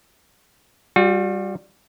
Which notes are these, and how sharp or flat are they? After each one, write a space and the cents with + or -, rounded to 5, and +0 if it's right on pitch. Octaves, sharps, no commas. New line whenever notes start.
G3 +0 F#4 -45